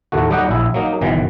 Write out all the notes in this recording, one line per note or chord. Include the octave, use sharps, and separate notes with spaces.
D#2 A2 A3 F#4
F#3 G3 D#4 G4 D#5 F#5
A#1 E4
F#3 A#3 D#4
G1 B2 D#3 E3